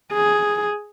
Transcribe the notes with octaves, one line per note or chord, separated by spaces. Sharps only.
G#4